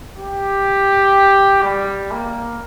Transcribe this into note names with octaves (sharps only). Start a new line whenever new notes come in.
G4
G3
A#3